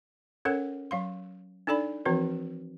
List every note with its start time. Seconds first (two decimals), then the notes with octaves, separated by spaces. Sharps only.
0.45 C#4 A4 A#4 C#5 F#5
0.91 F#3 F5 C6
1.67 D4 D#4 A4 D5 B5
2.06 E3 F3 C4 F#4 C#5